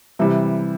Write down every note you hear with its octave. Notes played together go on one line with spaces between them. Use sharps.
C3 E3 G3